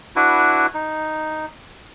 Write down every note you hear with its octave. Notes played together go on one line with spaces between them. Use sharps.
D4 E4 F#4 B4
D#4